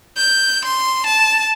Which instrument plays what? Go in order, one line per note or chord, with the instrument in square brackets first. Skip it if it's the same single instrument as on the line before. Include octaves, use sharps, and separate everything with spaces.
[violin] G6
C6
A5